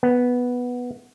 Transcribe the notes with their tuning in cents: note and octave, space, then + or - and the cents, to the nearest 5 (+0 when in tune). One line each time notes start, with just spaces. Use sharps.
B3 -5